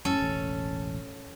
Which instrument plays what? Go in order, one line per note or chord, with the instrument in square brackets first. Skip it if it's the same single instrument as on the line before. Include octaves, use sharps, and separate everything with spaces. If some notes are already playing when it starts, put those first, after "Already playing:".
[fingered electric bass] F#2 A2 [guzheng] C#4 A4
[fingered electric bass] E1 A1